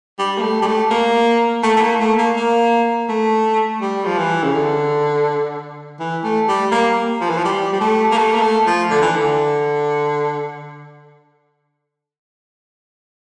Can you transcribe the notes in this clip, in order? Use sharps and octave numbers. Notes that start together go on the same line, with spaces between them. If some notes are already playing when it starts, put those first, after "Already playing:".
G3
A#3
A3
G3
A3
A#3
A3
A3
A#3
A3
A#3
A#3
A3
G3
F3
E3
C#3
D3
E3
A3
G3
A#3
F3
E3
F3
G3
G3
A3
A#3
A3
A#3
A3
F3
D3
E3
D3